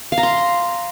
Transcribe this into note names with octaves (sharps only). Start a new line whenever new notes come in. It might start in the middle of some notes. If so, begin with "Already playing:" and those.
F5
A#5
C6